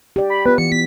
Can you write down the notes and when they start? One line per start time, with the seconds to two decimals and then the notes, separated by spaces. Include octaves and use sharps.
0.16 G4 D5
0.30 B5
0.46 B3 F4 B4
0.58 E3 C#7
0.72 B3 B6